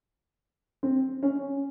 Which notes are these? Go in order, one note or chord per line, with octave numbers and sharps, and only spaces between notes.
C4
C#4